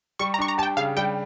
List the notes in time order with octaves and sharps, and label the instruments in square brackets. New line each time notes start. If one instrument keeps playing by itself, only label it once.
[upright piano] G3 [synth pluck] C#6
[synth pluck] A#5
[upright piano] D4 [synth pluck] C#6
[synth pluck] A#5
[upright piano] G4 [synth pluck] A5
[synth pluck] G5
[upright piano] C#3 [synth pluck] F5
[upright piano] G3 [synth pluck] G5